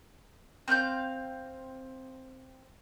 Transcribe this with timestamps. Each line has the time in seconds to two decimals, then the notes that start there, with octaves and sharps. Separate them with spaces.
0.68 C4 F5 F#5 G6